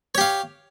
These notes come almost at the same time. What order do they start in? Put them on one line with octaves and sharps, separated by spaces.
C#5 G4 F5